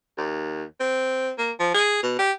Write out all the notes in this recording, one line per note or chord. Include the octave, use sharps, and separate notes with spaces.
D#2
C4
A#3
F3
G#4
B2
G4